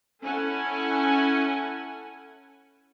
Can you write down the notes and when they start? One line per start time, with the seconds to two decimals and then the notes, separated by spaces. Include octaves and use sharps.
0.24 C#4 E4 A4 F#5 G#5